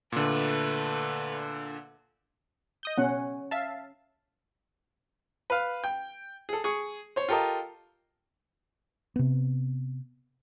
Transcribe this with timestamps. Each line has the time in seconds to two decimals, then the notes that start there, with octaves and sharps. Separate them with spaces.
0.12 A#2 D3 A3 B4
2.83 D#5 D#6 G6
2.98 B2 C#4 F#5
3.51 E5 F5 A5
5.50 B4 F5
5.84 G5
6.49 G#4 A4
6.64 G#4 C#6
7.16 C5 C#5
7.29 F4 G4 A4 A#4 D#5
9.16 C3 B3